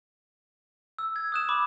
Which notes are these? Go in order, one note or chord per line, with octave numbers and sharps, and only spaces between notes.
E6
G#6
D#6 F#6 E7
B5 D6